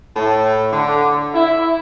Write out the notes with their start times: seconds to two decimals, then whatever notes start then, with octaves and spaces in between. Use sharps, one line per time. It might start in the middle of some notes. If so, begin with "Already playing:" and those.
0.16 A2
0.73 D3
1.34 E4